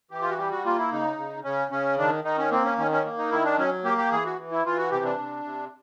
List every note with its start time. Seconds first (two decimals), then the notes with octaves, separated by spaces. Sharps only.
0.11 E3 G4
0.22 F4
0.30 F#4
0.38 G3 G4
0.51 F#4
0.65 A#3 F4
0.78 E4
0.91 C#3 D#4
1.18 C#3
1.44 C#3 C#4
1.71 C#3 C#4
1.98 D#3 D4
2.24 D#3 D#4
2.38 C#4
2.51 A#3 C4
2.65 C#4
2.78 D#3 C#4
2.91 C#4
3.05 A#3
3.18 D#4
3.31 D#3 E4
3.45 D4
3.58 F#3 C#4
3.84 A#3 G4
3.98 G4
4.11 E3 G#4
4.25 F#4
4.39 E3
4.52 E4
4.65 E3 F4
4.78 F#4
4.92 C3 G4
5.05 D4
5.18 C3
5.44 C3